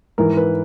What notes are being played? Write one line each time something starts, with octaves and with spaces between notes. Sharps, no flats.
G#2 E3 A#4
B4